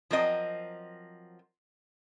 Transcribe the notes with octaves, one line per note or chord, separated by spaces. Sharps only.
F3 F#3 C4 A#4 D#5